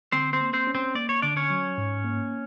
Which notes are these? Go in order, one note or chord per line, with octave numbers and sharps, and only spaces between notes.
D3 C4 C5
C4 C5
A#3
C4 C5
C#4
C4 C5
A#3 D5
C#5
D3 D4 D5
C#4 C#5
F#3
G#2
A#3